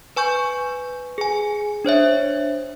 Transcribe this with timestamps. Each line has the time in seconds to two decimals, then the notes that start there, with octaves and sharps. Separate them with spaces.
0.16 B4 G#5 C#6 G6
1.18 G#4 G#5
1.85 D4 C5 C#5 E5